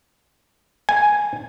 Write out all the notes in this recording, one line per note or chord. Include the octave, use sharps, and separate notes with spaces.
G#5